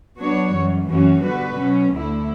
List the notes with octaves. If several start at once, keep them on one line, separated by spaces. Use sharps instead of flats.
F#3 B3 D4 F#4 C#5
F#2 E3 G3
F#2 E3 A3 C#4 F#4
D3 G3 B3 F#4 B4
B2 F#3 C#4
D2 D3 A3 E4